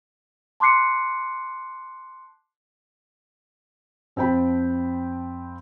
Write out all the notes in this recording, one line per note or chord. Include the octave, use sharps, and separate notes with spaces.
A5 C6 D6 F#6 C7 C#7
F2 C4 F4 G5 A5 B5